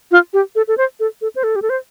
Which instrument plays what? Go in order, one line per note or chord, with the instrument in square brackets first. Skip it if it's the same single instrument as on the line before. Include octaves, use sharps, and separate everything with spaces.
[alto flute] F4
G4
A4
A4
C5
A4
A4
C5
A4
G4
A4
C5